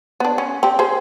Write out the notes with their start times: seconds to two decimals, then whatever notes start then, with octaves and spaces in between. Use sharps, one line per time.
0.20 B3 D4
0.38 C#4
0.63 C4 G4
0.79 G#4 C5